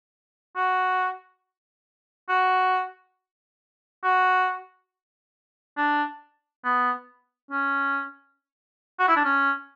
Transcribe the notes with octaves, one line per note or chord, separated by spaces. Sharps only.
F#4
F#4
F#4
D4
B3
C#4
F#4
E4
D4
C#4